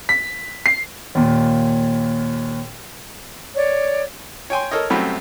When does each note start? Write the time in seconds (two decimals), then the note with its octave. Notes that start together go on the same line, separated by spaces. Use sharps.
0.09 B6
0.66 C7
1.15 D#2 A#2
3.55 C#5 D5
4.50 C#5 G5 G#5 C6
4.71 A4 A#4 C#5 D#5
4.90 C2 F#2 A3 C4 F#4 B5